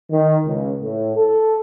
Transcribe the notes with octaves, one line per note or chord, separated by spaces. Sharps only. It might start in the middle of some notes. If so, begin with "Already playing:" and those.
D#3
C#2
A2
A4